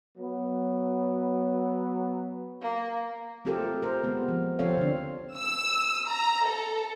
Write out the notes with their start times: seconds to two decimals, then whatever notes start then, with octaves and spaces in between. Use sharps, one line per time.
0.18 F#3 B3
2.62 A#3
3.45 A3 C4 F4 G4 A4 A#4
3.82 A#4 C5
4.04 G#3 B3
4.28 F3
4.59 F3 C4 A4 C#5 F5
4.77 D3 D4
5.37 E6
6.09 A#5
6.47 A4